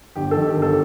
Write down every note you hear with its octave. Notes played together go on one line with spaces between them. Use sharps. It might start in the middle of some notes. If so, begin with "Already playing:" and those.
G1 G4
A4
D#3
G4
G1
A4